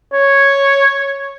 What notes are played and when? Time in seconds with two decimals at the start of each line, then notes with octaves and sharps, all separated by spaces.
0.13 C#5